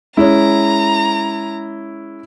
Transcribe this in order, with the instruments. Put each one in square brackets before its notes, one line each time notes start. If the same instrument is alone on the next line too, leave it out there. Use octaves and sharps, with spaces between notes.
[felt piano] G#3 C#4 [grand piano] E4 [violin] A#5